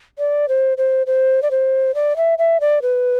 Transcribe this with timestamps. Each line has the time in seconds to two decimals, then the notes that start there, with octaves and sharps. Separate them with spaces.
0.19 D5
0.48 C5
0.78 C5
1.07 C5
1.42 D5
1.51 C5
1.95 D5
2.17 E5
2.38 E5
2.61 D5
2.82 B4